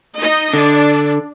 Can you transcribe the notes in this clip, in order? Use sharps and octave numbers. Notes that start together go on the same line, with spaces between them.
D#4 D#5
D3 D4